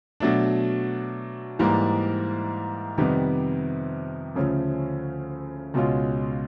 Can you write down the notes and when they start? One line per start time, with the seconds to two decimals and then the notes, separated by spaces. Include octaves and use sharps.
0.20 B2 F#3 A3 D4
1.59 G#2 E3 G3 A#3
2.97 F2 C3 D#3 G3 B3
4.36 D2 C#3 F3 A3 C#4
5.74 C#2 B2 G#3 C#4 F4